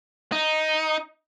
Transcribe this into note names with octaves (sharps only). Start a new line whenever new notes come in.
D#4